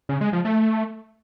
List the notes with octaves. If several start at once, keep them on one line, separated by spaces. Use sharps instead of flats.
C#3
G#3
F3
A3